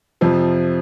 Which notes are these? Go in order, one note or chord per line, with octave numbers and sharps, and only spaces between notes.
F2 C3 F3